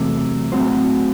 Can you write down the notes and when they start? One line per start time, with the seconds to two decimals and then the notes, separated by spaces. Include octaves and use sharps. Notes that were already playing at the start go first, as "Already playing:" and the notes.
Already playing: E2 C3 F#3 A3
0.52 A2 F#3 C4 F#4 C5